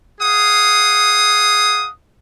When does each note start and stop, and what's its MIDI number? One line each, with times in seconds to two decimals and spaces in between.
0.20 1.88 68
0.20 1.88 77
0.20 1.88 78
0.20 1.88 87